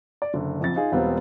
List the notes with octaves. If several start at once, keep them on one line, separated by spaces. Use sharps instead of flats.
D5
F#1 D3
A#1 F2 A6
D#4 F4 G#4
E1 G3 B3 C4 F4